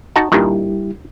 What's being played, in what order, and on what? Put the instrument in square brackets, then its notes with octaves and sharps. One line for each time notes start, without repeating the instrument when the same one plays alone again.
[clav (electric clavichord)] D#4 F#4 A5
[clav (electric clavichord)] G2 A#2 D#3 [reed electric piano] G3 E4 G4